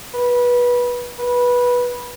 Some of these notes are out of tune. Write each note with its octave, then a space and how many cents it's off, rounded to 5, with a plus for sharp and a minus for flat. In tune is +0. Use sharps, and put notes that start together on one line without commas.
B4 -20
B4 -15